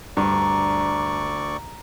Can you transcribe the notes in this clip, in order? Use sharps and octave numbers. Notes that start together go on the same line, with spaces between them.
D2 G2 D5 A#5 C#6